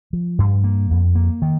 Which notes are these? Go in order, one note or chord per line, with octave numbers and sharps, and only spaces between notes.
F3
G2
A#3
F2
A#3
D#3